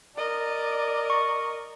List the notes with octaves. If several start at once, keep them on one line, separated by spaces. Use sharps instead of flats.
A#4 D5 D#5
C#6